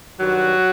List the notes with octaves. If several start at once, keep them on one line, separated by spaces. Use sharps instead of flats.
G2 D#3 F#3 G3 F#4